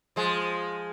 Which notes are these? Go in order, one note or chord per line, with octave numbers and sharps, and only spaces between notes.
F3 G#3